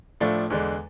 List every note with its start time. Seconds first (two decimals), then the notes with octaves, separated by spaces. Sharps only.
0.21 A2 F3 A3 D4 F4
0.50 E2 D3 G#3 D4